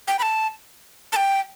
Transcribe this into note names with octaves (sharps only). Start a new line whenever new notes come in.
G5
B5
A5
A5
G5